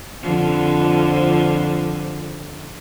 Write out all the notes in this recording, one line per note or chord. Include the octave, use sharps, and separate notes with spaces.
F2 D3 F3